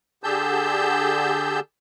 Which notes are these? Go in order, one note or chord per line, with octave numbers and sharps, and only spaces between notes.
D3 G4 G#4 A5 E6 G6